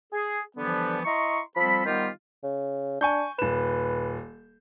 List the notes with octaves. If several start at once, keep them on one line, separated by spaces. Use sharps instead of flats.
G#4
D3 E3 F3 G3 B3
E4 D#5 A#5 C6 C#6
F3 G3 C4 A4 B5
D#3 G3 B3 F4 G4 C5
C#3
D4 G#5 C#6 G6
D#1 B4 E7